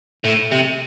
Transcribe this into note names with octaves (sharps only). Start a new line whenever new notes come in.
A2
C3